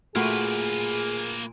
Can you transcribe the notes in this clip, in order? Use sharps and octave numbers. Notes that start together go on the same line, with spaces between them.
A#2 A3 A#3 F#4 G#4 B4